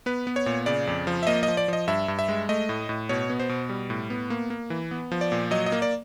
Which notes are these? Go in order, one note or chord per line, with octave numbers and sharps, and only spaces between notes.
B3 B4
B3
C#5
A#2
C#3 D5
F2
F3
E5
A#3 D#5
D#5
F3
D5
F3 D#5
G2 E5
G2
E5
G#3
A3 D#5
A2
A2
B2 C#5
B3
C5
B2
G3
A2
B3
A#3
A#3
E3
B3
F3
D5
A#2
F#3 D#5
D#5
A#3
D5